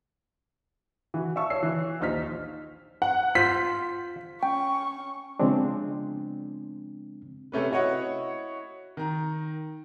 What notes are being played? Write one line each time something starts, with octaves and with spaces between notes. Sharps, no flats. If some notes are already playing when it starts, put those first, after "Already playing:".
E3 F#4
E5 F5 A5 C#6 E6
C#5 E6 C7
E3
A#1 D#2 D#4 C5 F6 B6
F#5
F4 C5 B6
C#4 G5 C#6
C#3 F3 G#3 B3 C4 D4
C3 A3 C#4 B4
E4 F#4 C#5 D#5 F#5
D#3 A#5